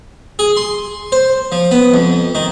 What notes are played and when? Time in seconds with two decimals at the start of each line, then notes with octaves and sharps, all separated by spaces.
0.39 G#4
0.57 C6
1.12 C5
1.52 F3
1.71 B3
1.93 F2
2.35 D#3